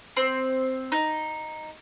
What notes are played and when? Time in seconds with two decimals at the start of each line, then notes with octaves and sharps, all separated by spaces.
0.17 C4
0.92 D#4